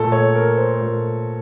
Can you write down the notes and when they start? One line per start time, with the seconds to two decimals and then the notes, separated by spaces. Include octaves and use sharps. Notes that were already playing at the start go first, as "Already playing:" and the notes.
Already playing: A#2 A3 A4
0.12 C#5
0.35 A#4
0.57 C5
0.81 A#2 A3 A#4